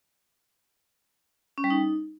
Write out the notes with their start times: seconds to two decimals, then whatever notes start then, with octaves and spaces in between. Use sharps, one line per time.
1.58 C#4
1.64 G3
1.70 D#4